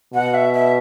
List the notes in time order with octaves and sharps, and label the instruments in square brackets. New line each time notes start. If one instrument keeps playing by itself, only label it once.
[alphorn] B2 [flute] F#5
[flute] E5
E5